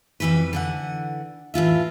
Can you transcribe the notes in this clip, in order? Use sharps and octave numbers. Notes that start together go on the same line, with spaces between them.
F2 C#3 E3 G3 B4
D3 E3 F#5
A2 E3 F4 E5